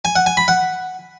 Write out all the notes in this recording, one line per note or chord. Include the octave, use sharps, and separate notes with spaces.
G#5
F#5
G#5
B5
F#5